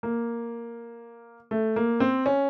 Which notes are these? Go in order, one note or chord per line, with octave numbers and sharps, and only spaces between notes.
A#3
A3
A#3
C4
C#4